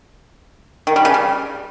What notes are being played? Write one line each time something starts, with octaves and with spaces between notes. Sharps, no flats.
D#3
G3
C#3
G3